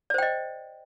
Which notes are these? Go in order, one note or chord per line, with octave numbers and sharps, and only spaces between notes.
C5 D5 D#5 G5